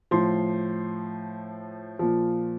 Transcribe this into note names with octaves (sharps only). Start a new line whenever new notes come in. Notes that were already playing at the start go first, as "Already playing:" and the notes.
A2 F3 C6
A#2 F3